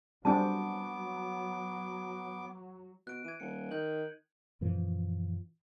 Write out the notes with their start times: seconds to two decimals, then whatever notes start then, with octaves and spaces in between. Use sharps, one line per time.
0.25 F#3 G3 B3 C4 D4 G#5 A5 D6
3.07 B2 F#6 D7
3.25 E3 G#6 D#7
3.40 D#1 C#7
3.71 D#3 G6 F#7
4.61 F#2 A#2 E3 F3